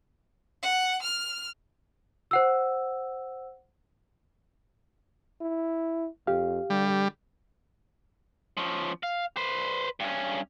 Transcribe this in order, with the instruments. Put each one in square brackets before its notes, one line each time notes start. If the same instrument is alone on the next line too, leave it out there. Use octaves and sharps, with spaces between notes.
[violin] F#5
F6
[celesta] C5 F#5 E6
[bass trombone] E4
[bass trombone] F2 [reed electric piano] G4 F5
[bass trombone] D3 [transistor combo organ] G3
[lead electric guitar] F3 C#4
F5
B4 C5
G2 C#4